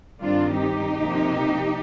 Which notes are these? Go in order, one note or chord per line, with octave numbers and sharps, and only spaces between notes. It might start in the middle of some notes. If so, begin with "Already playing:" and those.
G2 D#3 G3 C4 D4 F4
D#4 G4
C3 F3 A#3